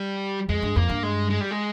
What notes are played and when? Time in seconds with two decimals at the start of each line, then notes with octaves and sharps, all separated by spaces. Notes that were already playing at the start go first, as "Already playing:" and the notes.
Already playing: G3
0.49 F2 G#3
0.63 G2
0.76 F2 A#3
0.89 G2
1.03 G#3
1.30 G#3
1.41 G3
1.51 G#3